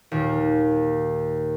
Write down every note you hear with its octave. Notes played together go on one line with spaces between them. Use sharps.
D#2 A#2